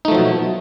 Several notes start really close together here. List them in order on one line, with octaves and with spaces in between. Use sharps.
D#4 A3 F3 F#3 B2